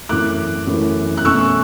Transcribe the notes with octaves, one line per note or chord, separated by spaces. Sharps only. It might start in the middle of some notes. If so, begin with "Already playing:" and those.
F#2 E3 A3 D6 F#6
F#2 E3 A3
F#6
B2 A3 C#4 C#6 E6